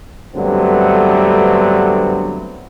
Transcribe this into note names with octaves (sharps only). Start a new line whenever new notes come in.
G2 D3 F#3 A3 B3 C4